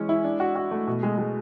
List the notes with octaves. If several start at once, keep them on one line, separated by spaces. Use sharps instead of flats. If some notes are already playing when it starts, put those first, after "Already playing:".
Already playing: E3 G#3 C#4
E4
D4
F#4
F#4
A3
B2
G#3
G#3